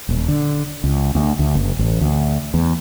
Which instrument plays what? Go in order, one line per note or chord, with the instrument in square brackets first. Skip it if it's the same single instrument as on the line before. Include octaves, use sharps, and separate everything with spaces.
[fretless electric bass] D#1
D3
C#2
D2
D2
F#1
A1
D2
E2